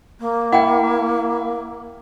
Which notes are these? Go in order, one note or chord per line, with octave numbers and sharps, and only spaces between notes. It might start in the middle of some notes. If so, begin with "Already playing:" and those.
A#3
E4 F#5 G5